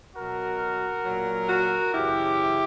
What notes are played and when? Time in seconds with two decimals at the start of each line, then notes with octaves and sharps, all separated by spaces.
0.15 B2 F#3 F#4 A#4
1.04 A#2 F#3
1.48 F#4 A#4
1.93 F#2 C#3 E3 E4 G4